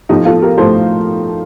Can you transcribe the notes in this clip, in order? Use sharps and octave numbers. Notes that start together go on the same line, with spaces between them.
A2 F3 A3 D#4 G4
F4 A4
G4 A#4
A2 F3 A3 A4 C5